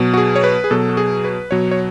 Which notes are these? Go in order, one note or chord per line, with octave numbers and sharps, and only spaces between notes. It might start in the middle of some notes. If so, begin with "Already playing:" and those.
Already playing: B2 F#3
F#4
G#4
C#5
B4
G#4
B2 F#3 A4
F#4
G#4
B4
B2 F#3 C#5
C#5